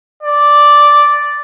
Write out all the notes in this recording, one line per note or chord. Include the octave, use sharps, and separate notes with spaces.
D5